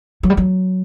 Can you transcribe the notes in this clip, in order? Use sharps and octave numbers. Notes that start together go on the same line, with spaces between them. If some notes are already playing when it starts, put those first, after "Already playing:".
F#3
G3
F#3